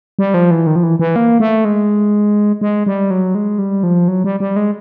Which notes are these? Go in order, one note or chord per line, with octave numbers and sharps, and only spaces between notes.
G3
F3
E3
D#3
F3
E3
E3
A#3
A3
G#3
G#3
G3
F#3
G#3
G3
F3
F#3
G3
G3
G#3